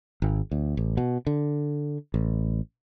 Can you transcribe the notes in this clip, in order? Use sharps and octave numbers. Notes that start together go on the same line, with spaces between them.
G#1
D2
A1
B2
D3
A1